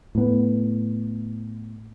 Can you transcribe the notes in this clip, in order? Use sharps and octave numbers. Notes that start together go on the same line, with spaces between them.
A2 B3